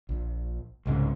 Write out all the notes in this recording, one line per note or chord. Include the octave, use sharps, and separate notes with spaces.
A#1
C2 G#2 C#3